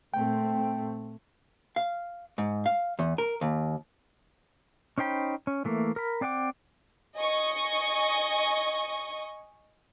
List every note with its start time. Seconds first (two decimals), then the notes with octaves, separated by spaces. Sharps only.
0.14 A#2 A3 C4 G5
1.76 F5
2.38 G#2
2.66 F5
2.99 E2
3.18 A#4
3.41 D#2
4.98 C#4 D#4 C5 G5 B5
5.47 C#4
5.65 E3 A3 A#3
5.96 A#4 B5
6.21 C4 D5 F#5 G5 D6
7.16 D#5 G#5 C#6